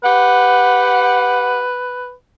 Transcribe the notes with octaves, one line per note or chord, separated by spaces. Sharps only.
G4 B4 F#5